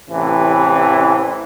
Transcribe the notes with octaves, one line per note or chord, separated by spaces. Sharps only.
A1 C3 E3